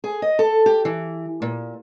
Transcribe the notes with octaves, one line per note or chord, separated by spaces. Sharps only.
G#4
D#5
A4
G4
E3
A#2